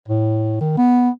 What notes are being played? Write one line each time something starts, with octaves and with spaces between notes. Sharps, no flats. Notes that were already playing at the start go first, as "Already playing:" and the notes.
A2
D#3
B3